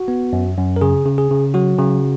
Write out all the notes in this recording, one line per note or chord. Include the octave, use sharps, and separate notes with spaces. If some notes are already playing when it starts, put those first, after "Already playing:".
Already playing: F#4
B3
F#2
F#2
A#4
C#3 G#4
C#3
G#4
C#3
F#3 F#4
C#3